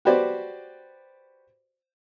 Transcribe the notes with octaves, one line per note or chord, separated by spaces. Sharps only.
F#4 G4 B4 C5 D5